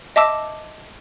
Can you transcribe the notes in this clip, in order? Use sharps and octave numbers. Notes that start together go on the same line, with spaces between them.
D#5 E5 A5 D6 E6